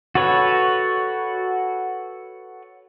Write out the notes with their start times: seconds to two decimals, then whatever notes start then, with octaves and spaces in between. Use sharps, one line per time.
0.15 F#4 A4 B4 C#5